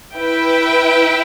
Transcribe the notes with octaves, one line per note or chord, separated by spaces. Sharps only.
E4 B4 E5 G5